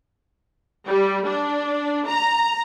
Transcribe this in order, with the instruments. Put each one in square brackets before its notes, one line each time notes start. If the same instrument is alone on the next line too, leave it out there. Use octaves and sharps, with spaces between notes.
[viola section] G3
D4
A#5